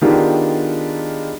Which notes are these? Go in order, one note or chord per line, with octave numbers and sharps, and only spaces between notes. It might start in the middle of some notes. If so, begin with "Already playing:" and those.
D#3 G#3 B3 D4 F4 G4